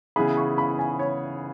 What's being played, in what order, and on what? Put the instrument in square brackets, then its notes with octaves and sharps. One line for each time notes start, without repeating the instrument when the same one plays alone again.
[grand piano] C#3 E3 B3 E4 G#4 [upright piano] B5
[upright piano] C#6
B5
G#5
C#5